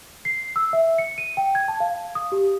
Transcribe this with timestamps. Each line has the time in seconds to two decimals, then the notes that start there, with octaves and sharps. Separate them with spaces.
0.25 C7
0.56 E6
0.73 E5
0.98 C#7
1.18 D#7
1.37 G5
1.55 G#6
1.68 A5
1.80 F5
2.15 D#6
2.32 G4